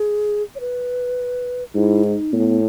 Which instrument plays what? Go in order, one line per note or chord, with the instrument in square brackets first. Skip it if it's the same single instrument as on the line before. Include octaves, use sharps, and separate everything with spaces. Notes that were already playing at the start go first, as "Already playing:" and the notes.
Already playing: [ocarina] G#4
C#5
B4
[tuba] G#2 [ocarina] E4
[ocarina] D#4
[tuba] A2 [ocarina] B3